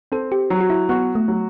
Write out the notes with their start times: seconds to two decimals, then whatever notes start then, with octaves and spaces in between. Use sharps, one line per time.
0.12 C4 A4
0.32 G4
0.50 F#3 F#4
0.61 F#4
0.70 E4
0.89 B3 F#4
1.15 A3
1.28 F#3